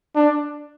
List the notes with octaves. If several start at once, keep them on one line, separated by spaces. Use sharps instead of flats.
D4